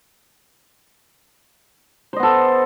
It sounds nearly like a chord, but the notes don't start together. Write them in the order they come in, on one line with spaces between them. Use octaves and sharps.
C5 D#5 B3 A4